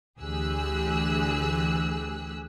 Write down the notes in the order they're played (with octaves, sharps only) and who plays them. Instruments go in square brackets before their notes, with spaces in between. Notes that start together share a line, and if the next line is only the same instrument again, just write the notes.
[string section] D2 E3 G4 G#4 E6 F#6